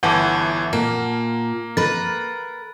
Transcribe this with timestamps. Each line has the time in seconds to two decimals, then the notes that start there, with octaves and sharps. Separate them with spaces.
0.03 G1 E3 F#5 A5 D6
0.73 A#2 A#3
1.77 A#4 B4 A6